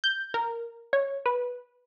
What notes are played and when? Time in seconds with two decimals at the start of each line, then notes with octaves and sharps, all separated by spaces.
0.04 G6
0.34 A#4
0.93 C#5
1.26 B4